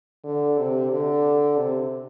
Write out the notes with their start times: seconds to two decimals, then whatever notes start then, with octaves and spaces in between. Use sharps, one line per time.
0.24 D3
0.58 C3
0.90 D3
1.57 C3